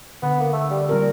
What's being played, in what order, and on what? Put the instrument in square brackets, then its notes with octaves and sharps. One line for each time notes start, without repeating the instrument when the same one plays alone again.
[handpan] D3 [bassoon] B3
[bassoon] A#3
A3
G3
[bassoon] A#2 [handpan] G3 C4 A#4